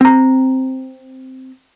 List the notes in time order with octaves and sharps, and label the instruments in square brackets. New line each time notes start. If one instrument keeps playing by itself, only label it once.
[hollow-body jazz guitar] C4 A#5